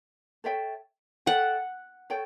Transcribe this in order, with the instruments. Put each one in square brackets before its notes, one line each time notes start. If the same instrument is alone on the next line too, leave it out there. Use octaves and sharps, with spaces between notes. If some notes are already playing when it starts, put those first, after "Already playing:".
[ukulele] A4 C#5 E5 G5
[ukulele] A4 C#5 E5 G5 [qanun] F#5
[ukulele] A4 C#5 G5